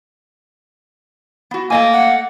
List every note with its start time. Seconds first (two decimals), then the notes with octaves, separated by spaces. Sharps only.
1.51 B3 F#4
1.70 A3 A#3 D#5 G#5
1.93 F#5